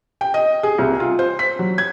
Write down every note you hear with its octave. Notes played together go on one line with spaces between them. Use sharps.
G5
D#5
G#4
C2
F4
C5
B6
F#3
G#6